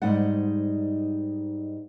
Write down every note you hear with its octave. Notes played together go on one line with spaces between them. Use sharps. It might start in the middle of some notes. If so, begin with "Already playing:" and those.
G#2 G3 D#4 C5 D5 F#5